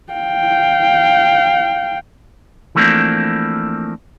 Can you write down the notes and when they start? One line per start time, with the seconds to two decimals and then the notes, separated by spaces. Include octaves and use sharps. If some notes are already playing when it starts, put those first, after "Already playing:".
0.13 F5 G5
2.75 E3 F3 A3 A#3 C4 D4